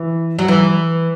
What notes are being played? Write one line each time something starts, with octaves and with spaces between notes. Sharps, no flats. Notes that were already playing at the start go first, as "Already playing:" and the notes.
Already playing: E3
F#3
E3